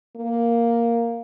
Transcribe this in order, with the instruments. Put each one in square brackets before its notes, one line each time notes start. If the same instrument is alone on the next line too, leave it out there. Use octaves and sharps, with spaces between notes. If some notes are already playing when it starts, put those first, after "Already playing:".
[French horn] A#3